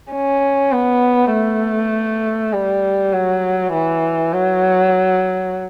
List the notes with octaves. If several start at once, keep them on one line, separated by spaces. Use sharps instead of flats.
C#4
B3
A3
G3
F#3
E3
F#3